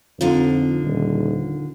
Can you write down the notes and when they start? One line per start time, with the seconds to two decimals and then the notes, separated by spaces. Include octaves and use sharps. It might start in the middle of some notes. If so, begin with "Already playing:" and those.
0.21 F2 D3 F3 D#4
0.84 D#1